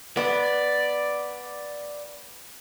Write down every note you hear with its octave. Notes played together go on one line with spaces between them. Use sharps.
B3 D5